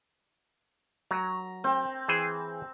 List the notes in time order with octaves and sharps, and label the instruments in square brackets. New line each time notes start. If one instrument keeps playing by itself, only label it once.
[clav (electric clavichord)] F#3 [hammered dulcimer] A#5
[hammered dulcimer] C4 G5
[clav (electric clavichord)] E3 G#4 C5